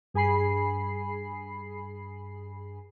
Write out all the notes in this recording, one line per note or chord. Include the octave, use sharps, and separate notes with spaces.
G2 G#4 G#5 B5 C7